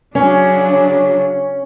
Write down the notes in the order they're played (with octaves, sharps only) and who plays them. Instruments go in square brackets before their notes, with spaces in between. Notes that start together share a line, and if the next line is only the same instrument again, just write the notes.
[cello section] C#3 F#3 D4 [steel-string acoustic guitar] C#4